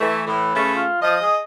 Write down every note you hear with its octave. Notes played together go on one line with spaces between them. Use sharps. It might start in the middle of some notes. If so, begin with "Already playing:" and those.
E3 A3
A2 E3 B4
C#3 A3 C#4
F4
F3 D#5
G#4